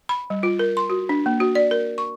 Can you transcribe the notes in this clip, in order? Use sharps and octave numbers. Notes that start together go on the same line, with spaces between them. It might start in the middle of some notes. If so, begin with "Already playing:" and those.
B5
G3
F4
A#4
C6
F#4
D4
A#3
F#4
D5
A#4
C#6